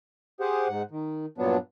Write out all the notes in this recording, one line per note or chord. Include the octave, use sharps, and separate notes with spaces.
G4 G#4 C5 F#5
G#2 F#5
D#3
G2 A#2 F#3 B3 D4